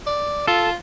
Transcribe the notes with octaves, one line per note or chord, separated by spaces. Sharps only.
D5
F4 A4